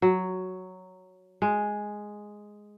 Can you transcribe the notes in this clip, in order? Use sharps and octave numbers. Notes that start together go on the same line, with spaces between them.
F#3
G#3